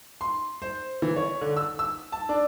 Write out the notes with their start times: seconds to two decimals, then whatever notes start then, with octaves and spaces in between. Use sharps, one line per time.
0.21 C6
0.62 C5
1.02 E3
1.16 C#5
1.41 D3
1.57 E6
1.79 E6
2.12 A5
2.29 D4